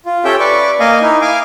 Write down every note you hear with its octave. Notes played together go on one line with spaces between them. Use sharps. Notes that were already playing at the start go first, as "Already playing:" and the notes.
F4
C#4 G4 A4 E5 G5
B4 D5 C#6 D6
A#3 D#5 F5 G#5
D#4 E4
F5 G#5 D6